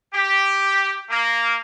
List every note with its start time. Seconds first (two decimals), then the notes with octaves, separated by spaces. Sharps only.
0.14 G4
1.10 A#3